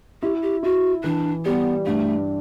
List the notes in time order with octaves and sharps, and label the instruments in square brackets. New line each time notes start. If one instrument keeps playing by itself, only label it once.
[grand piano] E4 [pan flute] G4
[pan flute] G4
[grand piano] E4 [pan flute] F#4
[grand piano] E3 [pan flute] D4
[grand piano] G3 [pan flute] B3
[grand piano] G2 [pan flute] A3